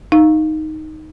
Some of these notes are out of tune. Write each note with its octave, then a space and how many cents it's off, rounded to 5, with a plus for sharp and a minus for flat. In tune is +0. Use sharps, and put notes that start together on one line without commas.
D#4 +0 F5 +0